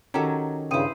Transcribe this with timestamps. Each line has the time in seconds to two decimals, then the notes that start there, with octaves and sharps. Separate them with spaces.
0.14 D#3 F#3 C#4 G4 A4 A#5
0.71 G2 C#3 E4 C5 G5 D#6 D#7